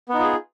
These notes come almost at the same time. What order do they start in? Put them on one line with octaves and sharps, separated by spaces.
B3 D#4 F4 G#4